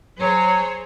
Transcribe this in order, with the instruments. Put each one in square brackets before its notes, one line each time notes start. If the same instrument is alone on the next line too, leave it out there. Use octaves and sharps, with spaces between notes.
[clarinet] F#3 [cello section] G#4 C5 C#5